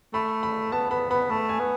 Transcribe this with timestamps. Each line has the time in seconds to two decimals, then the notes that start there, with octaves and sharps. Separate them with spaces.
0.14 A3 B5
0.43 B5
0.72 B3 A5
0.90 B3 B5
1.10 B3 B5
1.30 A3 A5
1.49 G#5
1.59 B3